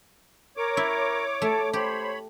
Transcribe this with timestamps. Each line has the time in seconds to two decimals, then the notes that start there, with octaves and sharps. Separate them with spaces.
0.57 A#4 C#5 D6
0.77 E4
1.42 A3 A4
1.73 G4 C5 C#5 B5